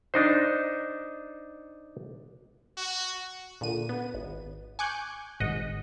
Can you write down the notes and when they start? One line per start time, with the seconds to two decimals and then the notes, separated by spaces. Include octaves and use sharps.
0.14 D4 D#4 C5
2.77 F#4
3.61 A#2 D3 D#7
3.89 B3
4.14 G#1
4.79 G#5 C#6 D6 F#6 G6
5.40 G#1 G#2 D#5 F#5